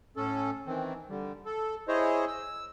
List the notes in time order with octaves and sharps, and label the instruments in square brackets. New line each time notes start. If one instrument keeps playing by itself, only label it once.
[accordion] A2 C#4 A4
D#3 E3 C4
D3 G3
A4
E4 G#4 C5 C#5 D#5
E6